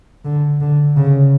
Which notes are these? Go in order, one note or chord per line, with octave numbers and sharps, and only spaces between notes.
D3
D3
C#3